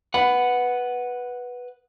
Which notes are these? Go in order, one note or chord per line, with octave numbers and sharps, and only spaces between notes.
B4 F#5 B5